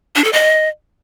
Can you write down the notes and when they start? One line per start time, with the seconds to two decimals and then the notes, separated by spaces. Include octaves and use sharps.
0.16 D4
0.24 A4
0.33 D#5